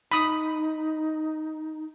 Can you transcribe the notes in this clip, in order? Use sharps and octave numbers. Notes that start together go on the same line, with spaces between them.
D#4 B5 D#6